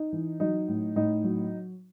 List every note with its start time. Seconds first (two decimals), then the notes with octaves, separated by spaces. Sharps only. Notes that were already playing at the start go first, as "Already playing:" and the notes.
Already playing: D#4
0.12 E3
0.40 F#3 D#4
0.68 A2
0.96 A2 D#4
1.24 F#3